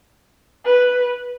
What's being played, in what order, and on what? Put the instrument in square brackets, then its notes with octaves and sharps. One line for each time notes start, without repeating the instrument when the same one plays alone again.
[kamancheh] B4